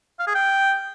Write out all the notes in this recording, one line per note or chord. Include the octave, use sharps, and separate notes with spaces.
F5
G#4
G5